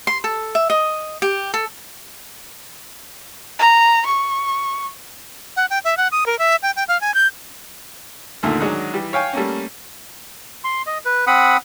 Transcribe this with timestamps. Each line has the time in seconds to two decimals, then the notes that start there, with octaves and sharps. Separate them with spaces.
0.07 C6
0.24 A4
0.55 E5
0.70 D#5
1.22 G4
1.54 A4
3.59 A#5
4.06 C#6
5.56 F#5
5.70 G5
5.84 E5
5.97 F#5
6.12 D#6
6.26 A#4
6.39 E5
6.63 G5
6.76 G5
6.88 F5
7.01 G#5
7.14 G6
8.43 D2 A#2 D3 D#3 A3
8.60 D#3 F#3 G#3 D4 D#4 F#5
8.93 E3 G3 G4
9.13 C#5 F5 G5 G#5
9.33 G3 A3 A#3 C#4
10.64 C6
10.86 D#5
11.05 B4
11.27 C4 F#5 B5 D#6